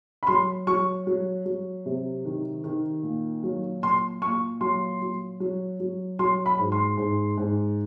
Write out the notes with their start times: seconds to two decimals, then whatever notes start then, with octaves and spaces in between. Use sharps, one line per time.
0.23 B5
0.27 F#3 C6
0.67 F#3 C#6
1.07 F#3
1.46 F#3
1.86 C3
2.25 D#3
2.64 D#3
3.03 A#2
3.43 F#3
3.83 A#2 C6
4.22 A#2 C#6
4.61 F#3 C6
5.01 F#3
5.40 F#3
5.80 F#3
6.19 F#3 C6
6.46 B5
6.59 G#2
6.72 C6
6.97 G#2
7.37 G#2